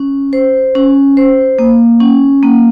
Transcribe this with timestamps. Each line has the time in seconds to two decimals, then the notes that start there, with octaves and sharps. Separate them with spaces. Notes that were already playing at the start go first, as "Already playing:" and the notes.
Already playing: C#4
0.33 C5
0.75 C#4
1.17 C5
1.59 A#3
2.00 C#4
2.43 A#3